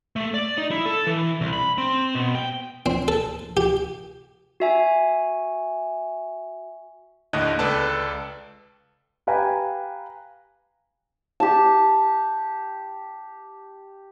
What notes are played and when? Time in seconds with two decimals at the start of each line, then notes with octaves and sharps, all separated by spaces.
0.16 A3
0.34 D5
0.58 D#4
0.71 E4
0.86 A4
1.07 E3
1.41 C2
1.53 B5
1.78 C4
2.15 B2
2.35 G5
2.86 C4
3.08 A4
3.57 G4
4.60 F#4 E5 G#5
7.33 D#2 A2 D3 D#5 F#6
7.59 C#2 A4 B4 D5 A5
9.27 G4 B4 F5 G5 G#5 A#5
11.40 G4 A5